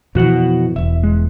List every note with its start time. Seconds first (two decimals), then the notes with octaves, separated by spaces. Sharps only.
0.15 F2 B2 E3 F#4 F#5
0.76 E1 E2 E5
1.03 G#3